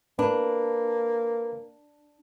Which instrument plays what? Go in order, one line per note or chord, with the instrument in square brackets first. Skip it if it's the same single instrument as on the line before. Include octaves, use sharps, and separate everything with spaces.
[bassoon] A#3 [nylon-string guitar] D4 [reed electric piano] B4